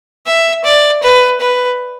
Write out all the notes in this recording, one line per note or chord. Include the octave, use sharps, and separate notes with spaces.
E5
D5
B4
B4